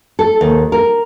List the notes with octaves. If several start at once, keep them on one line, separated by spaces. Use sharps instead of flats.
A4
D#2
A#4